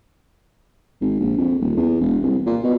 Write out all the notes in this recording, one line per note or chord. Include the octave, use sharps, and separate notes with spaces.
G#1
A#1
F2
D#1
E2
E1
C2
A#2
B2